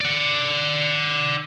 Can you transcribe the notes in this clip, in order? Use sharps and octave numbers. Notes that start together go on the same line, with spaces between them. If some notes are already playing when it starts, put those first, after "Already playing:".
D5 F#5